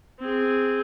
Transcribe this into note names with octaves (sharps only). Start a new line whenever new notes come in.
C4 G#4